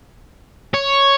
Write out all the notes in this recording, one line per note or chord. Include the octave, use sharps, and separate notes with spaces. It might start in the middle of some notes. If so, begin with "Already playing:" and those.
C#5